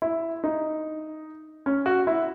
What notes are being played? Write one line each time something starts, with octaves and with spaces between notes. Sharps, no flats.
E4
D#4
C#4
F#4
E4